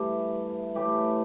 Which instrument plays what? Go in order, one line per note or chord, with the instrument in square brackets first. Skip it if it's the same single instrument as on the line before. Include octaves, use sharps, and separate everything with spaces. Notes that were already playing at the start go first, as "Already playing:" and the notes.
Already playing: [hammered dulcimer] G2 E3 A3 G4
A2 E3 A3 G4